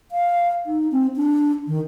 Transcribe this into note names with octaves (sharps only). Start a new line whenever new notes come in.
F5
D#4
C4
D4
D#3